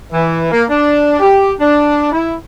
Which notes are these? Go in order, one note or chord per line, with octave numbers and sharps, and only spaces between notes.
E3
A#3
D4
G4
D4
E4